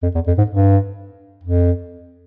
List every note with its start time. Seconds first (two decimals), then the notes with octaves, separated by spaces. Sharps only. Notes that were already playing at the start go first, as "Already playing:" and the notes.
0.03 F2
0.15 E2
0.27 F2
0.38 G#2
0.50 G2
1.44 F2